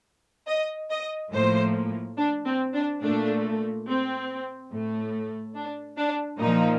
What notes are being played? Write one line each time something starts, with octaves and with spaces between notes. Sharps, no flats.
D#5
D#5
A2 F3 A#3 C5
D4
C4
D4
A#2 A3 D4
C4
A2 A3
D4
D4
A#2 F3 A#3 D#4